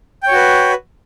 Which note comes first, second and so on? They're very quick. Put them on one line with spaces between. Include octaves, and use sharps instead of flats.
G5 C#5 F#4 B4